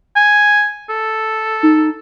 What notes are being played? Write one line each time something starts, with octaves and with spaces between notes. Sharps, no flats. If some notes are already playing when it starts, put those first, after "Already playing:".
G#5
A4
D#4